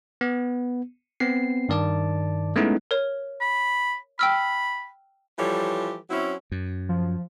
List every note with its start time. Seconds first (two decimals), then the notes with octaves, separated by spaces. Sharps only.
0.21 B3
1.20 B3 C4 C7
1.69 G2 D#3 D5 A5 D6
2.56 G#3 A3 B3 C#4 D#4 E4
2.91 A#4 C#5
3.41 B5
4.19 G5 B5 E6 F6
5.38 E3 F3 G3 G4 A4 C#5
6.10 F#3 C4 C#4 E4
6.52 F#2
6.89 F3